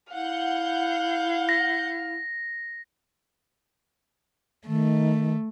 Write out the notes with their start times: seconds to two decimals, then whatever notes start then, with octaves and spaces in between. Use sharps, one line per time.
0.13 E4 F5 F#5 G6
1.49 A#6
4.67 D#3 A3